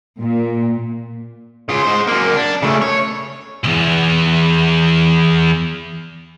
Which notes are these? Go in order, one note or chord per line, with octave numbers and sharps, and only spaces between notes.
A#2
C#3 F4
G#3 C5
F#2 A#3
D4
C#3 A3
C#5
B1 E2